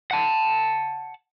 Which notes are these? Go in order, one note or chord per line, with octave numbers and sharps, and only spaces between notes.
F#5 A5